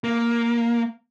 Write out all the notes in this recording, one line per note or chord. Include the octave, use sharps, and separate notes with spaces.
A#3